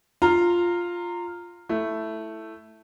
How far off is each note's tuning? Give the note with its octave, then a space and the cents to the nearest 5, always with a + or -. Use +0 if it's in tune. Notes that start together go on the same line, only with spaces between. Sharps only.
F4 +0 F5 +0 A#5 -15
A3 +0 E4 +5